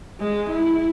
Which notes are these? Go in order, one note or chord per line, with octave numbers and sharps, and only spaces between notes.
G#3
E4